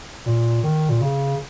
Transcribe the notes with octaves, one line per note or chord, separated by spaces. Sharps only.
A#2
D#3
A#2
C#3